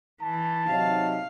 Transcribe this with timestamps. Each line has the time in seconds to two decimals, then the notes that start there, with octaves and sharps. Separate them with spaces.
0.22 E3 A5
0.68 C3 F#3 D#4 F5